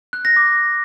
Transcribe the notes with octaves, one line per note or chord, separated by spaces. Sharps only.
F#6
A#6
D6